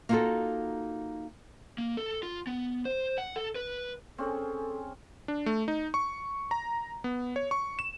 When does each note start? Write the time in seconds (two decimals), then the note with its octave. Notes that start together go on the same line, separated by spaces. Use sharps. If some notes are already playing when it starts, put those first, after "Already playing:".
0.09 A#3 B3 D#4 F4 F#4 A4
1.78 A#3
1.97 A4
2.23 F4
2.47 B3
2.85 C5
3.18 F#5
3.36 A4
3.55 B4
4.18 C4 C#4 G#4 A4
5.28 D4
5.46 A3
5.68 D#4
5.94 C#6
6.51 A#5
7.04 B3
7.36 C#5
7.51 C#6
7.79 E7